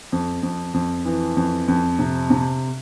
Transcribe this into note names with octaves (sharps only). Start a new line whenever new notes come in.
F2
F2
F2
E3
F2
F2
C3
C3